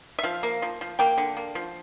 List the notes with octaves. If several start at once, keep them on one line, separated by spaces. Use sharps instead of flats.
E5
F3 F5
A#3
F3
F3
A#3 G5
D3
A#3
F3